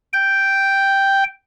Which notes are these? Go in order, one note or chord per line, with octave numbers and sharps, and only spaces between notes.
G5